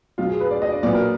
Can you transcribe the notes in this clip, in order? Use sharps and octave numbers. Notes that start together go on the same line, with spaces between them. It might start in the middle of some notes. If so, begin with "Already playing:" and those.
B1 B2 F#3 F4
G#4
B4
D5
D#5
D5
B1 A#2 F#3 B3 D5
A#4